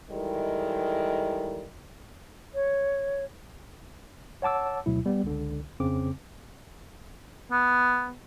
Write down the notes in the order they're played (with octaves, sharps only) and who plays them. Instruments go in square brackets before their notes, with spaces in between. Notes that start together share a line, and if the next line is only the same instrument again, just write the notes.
[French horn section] D#3 E3 G3 G#3 A4 A#4
[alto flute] C#5
[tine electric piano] C#5 F#5 A5 D6 E6
D2 B2 F#3 E4
G3 B3
C#2 D3
F2 C#3 C4 D6
[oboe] B3